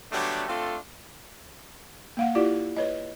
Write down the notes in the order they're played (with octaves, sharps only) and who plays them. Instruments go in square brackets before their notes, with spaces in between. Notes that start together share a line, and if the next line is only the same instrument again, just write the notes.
[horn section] D3 F#3 G3 A3 B3 D4
A3 C4 D4 F4 A4
[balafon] A#3 F5 F#5
E4 F4 G4 D5
B4 C#5 D#5